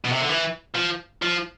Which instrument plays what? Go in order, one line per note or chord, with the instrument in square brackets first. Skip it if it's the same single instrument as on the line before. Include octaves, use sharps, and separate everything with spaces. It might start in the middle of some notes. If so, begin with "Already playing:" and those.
[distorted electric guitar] B2
C3
D3
E3
F3
F3